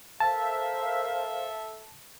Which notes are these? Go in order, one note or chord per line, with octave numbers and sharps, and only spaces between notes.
A4 A#4 C5 E5 F5 A5